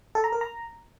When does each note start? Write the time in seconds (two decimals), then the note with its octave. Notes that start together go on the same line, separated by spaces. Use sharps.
0.15 A4
0.24 A#5
0.33 A#4
0.41 A#5